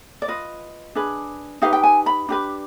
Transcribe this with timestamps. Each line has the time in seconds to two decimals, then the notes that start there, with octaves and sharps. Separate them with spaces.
0.22 D5
0.28 F4 B4 D#5
0.95 D4 G#4 B4
1.62 D#4 G4 B4 F5
1.73 G5
1.83 G#5
2.06 B5
2.29 D4 G4 B4